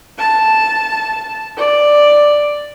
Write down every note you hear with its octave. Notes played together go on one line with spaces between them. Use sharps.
A5
D5